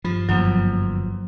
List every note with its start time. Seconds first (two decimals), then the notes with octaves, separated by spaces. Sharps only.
0.04 G2 F3
0.29 G1 F#2 F3 F#3 A#3